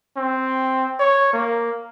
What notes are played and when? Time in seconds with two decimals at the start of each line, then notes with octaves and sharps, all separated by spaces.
0.17 C4
0.99 C#5
1.33 A#3